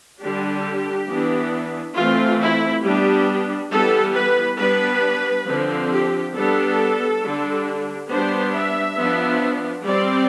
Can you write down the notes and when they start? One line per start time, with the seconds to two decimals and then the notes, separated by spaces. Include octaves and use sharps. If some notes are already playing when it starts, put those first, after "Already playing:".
0.20 D3 G3 D4 G4
1.08 E3 B3 D4
1.97 E3 A3 C4 F4
2.40 E4
2.84 G3 B3 D4 G4
3.71 E3 G3 B3 A4
4.15 B4
4.59 G3 B3 D4 B4
5.47 D3 F3 C4
5.91 G4
6.35 G3 B3 D4 A4
7.22 D3 G3 D4
8.10 G3 B3 D4 C5
8.54 E5
8.98 F3 B3 D4
9.85 G3 C4 D5